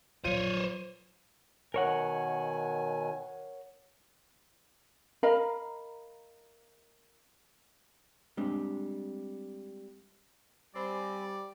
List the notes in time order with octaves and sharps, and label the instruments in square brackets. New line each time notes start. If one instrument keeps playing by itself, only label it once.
[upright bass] A#1 F#3 [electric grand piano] F4 D#7 [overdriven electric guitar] C5 C#5
[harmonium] B2 D#3 G#5 [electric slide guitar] A#4 C#5 F#5
[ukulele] A#4 D#5 F5 B5
[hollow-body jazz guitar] G3 G#3 C4 D4
[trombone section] G3 [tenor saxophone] C4 [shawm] D5 [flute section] G#5 B5